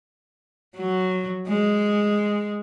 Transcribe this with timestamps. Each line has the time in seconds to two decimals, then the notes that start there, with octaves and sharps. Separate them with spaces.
0.76 F#3
1.48 G#3